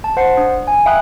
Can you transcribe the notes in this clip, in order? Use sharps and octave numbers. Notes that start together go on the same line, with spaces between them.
A5
C5 F#5 C7 C#7
D4
G#5
E5 F5 G5 B5 D#6 F#6